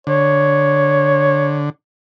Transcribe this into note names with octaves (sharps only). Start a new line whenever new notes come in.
D3 C#5